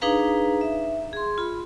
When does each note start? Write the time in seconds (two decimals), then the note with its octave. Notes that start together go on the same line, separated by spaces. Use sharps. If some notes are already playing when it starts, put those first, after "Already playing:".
0.01 D4 D#4 G#4 B4 F5 A#5
0.61 E5
1.13 G#4 C6
1.38 F4 B5